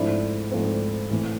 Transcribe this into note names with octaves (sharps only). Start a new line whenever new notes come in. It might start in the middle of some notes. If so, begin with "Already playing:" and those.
Already playing: G#2 F3 A3 C4 D4 E4
G#2 F3 A3 C4
A2 E3 A3 C4